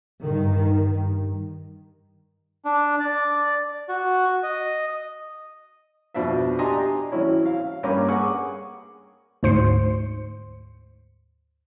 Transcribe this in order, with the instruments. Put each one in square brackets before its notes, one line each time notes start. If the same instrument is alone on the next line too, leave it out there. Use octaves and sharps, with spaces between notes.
[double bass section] G2 D#3
[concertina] D4
D5
F#4
D#5
[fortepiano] F2 B2 D4 C5 E5
D4 G4 D#5 G#5 A#5 C6
E3 F#3 C4 C#4 E4
F5
G2 A#3 C#4 A#5 B5 D6
G#4 F#5 G#5 C#6 D6
[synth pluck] D2 G#2 C5 C6 C#7